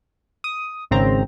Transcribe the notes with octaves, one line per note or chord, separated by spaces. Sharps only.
D#6
G#1 C#3 C4 A#5